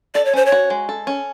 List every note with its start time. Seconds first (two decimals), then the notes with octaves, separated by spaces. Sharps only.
0.15 A4 D5
0.25 C#5
0.33 C#4 C5
0.46 C#5
0.52 F#4
0.70 G#3
0.89 A4
1.07 C#4